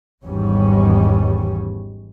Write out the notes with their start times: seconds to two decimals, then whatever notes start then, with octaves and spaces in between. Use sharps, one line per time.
0.24 G#1 E2 G#2 G3 C#4